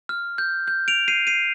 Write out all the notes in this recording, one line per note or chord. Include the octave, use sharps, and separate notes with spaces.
F6
G6
G6
D7 F7
C7 D#7
C7 D#7